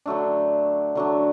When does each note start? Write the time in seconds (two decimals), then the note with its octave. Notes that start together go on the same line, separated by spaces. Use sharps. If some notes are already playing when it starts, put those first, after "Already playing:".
0.06 D3 F#3 A3 D4
0.95 D3 F#3 A3 D4